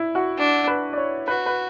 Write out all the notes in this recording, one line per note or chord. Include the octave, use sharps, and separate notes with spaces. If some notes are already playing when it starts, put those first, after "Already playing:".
Already playing: E4
F#4
D4
B4
D5
C#5
F#4 B4
B4